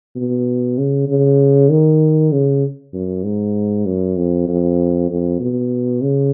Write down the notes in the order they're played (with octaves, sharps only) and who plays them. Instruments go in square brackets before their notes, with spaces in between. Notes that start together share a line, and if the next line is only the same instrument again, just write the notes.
[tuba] B2
C#3
C#3
D#3
C#3
F#2
G#2
F#2
F2
F2
F2
B2
C#3